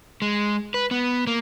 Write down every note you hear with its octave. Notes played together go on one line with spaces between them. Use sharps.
G#3
B4
B3
A#3